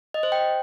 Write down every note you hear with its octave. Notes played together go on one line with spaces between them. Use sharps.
D#5
C5
G5